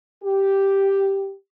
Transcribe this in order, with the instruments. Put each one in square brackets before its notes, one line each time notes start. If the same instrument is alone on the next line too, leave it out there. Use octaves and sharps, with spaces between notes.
[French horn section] G4